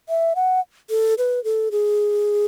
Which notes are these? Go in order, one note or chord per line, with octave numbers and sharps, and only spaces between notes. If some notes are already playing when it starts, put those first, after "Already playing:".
E5
F#5
A4
B4
A4
G#4